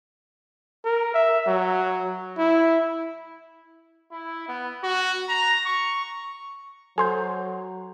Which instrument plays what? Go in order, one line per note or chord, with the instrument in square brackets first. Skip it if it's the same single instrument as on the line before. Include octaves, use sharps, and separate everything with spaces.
[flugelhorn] A#4
E5
F#3
E4
[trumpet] E4
B3
F#4
A#5
C#6
[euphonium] F#3 [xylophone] A4 C5 [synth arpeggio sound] G#5 C6 G6